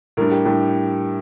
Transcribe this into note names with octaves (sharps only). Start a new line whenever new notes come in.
A2 G3 D4 A#4
G4
A2 G3 D4 G4